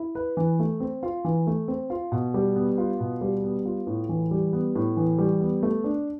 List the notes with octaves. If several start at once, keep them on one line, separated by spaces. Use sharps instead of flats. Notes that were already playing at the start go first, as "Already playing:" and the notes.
Already playing: E4
B4
E3
A3
C4
F4
E3
A3
C4
F4
B2
G3
B3
F4
B2
G3
B3
F4
A2
E3
G3
B3
A2
E3
G3
B3
A3
D4